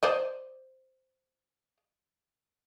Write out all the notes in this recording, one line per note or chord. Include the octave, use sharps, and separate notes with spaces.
C5 D5 D#5